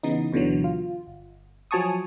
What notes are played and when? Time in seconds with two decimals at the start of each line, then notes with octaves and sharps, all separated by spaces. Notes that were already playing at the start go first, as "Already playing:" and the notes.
0.03 C#3 E3 B3 D#4
0.32 D2 B2 D3 E3 F#3
0.64 F4
1.07 G1
1.71 F3 F#3 G#5 A5 C#6 D#6